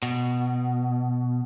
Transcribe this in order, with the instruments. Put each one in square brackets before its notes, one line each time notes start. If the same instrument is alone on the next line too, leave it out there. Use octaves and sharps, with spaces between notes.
[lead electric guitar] B2